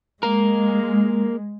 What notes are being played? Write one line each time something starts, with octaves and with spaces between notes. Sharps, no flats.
G#3 A#3 A#4